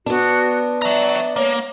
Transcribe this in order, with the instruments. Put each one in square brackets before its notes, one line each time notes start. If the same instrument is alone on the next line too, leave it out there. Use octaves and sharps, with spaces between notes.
[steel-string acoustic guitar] B3 D4 [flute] F#4
[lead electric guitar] C#5 A#5 [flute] D5 [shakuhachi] E5
[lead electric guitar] A#3 [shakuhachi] C#5